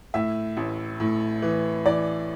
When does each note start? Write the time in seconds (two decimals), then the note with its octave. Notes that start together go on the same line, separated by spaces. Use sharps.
0.14 A2 E5
0.57 A1
1.00 A2
1.42 E3
1.85 E3 D5